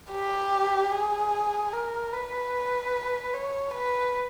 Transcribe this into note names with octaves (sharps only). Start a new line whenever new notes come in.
G4
G#4
A#4
B4
C#5
B4